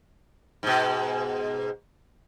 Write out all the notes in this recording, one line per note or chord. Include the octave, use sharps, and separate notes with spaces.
G#2 B2